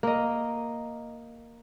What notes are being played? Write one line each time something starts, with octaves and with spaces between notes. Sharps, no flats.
A#3 D#5